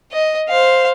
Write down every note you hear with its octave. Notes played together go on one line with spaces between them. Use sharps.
D#5
C5 F5